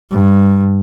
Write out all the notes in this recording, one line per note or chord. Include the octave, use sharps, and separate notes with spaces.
G2